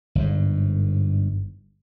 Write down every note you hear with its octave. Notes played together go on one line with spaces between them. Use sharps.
G1 G#2